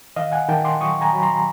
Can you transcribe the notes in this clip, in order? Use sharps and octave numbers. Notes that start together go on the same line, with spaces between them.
D#3 D#5 F5
F#5 G#5
D#3 G5 A5
C6 D6
F#3 C#6 D#6
G#5 A#5
F#3 B5
A#5 C6